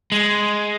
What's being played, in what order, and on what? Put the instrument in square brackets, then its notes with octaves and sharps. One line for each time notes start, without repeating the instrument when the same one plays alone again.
[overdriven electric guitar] G#3